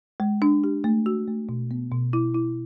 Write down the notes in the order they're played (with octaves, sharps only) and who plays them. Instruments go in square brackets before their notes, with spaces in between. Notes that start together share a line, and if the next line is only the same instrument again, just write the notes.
[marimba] G#3
D4
G4
A3
F#4
A3
B2
B3
B2
E4
E4